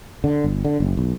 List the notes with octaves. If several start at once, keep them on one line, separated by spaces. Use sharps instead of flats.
D3
G1
D3
F#1
B1